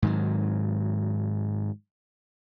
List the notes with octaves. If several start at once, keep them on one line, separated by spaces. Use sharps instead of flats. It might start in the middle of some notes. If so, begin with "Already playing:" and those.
G#2 D#3 F#3